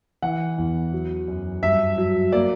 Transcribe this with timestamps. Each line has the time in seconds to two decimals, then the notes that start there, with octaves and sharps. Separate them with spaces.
0.22 E3 F#5
0.58 E2
0.92 F#3
1.28 F#2
1.63 G2 E5
1.98 F#3
2.32 A#3 D5